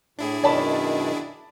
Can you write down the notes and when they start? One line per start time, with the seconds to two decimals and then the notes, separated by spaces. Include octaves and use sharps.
0.19 A2 D4 E4 G#4
0.44 F#2 B2 D#3 D5 A5 B5